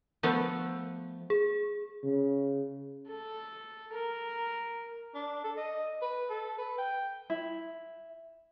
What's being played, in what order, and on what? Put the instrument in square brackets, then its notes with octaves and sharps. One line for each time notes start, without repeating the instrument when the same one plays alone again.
[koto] F3 A3 B3
[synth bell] G#4
[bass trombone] C#3
[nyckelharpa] A4
A#4
[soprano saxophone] D4
A4
D#5
B4
A4
B4
G5
[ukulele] E4